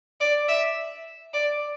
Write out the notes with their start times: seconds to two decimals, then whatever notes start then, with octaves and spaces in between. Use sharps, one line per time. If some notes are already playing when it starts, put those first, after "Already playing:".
0.20 D5
0.49 E5
1.34 D5